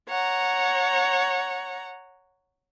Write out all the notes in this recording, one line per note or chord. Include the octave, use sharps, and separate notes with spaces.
C#5 F#5 A#5